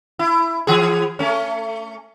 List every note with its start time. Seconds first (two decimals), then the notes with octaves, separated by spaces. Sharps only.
0.19 E4
0.67 E3 G#4
1.19 A3 C#4